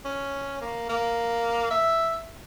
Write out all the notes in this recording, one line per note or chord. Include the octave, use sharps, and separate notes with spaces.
C#4
A#3
A#3
E5